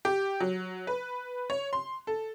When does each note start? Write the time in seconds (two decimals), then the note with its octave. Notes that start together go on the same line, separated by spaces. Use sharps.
0.05 G4
0.40 F#3
0.87 B4
1.50 C#5
1.73 C6
2.07 A4